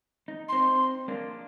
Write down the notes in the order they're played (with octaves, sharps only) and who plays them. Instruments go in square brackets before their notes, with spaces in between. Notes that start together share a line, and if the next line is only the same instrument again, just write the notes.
[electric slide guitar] D#4
[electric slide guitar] C4 D#4 [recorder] C6
[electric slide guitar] A#3 D4